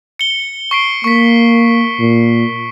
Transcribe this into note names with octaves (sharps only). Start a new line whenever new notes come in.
C#7 G7
C#6 C7 D7
A#3 C#6 B6
A#2